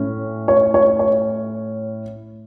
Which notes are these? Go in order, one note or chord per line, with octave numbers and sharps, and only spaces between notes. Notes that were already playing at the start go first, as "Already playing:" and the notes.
Already playing: A2 C#4
C#5
C#5
C#5